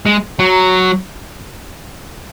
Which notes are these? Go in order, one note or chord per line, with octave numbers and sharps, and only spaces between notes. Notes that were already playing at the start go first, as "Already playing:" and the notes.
G#3
F#3